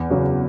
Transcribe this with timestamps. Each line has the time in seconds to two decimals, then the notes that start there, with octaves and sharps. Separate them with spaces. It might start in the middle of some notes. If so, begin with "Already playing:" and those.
Already playing: E2
0.10 C#3 F#3